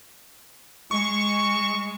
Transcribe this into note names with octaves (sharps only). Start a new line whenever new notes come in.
G#3 C#6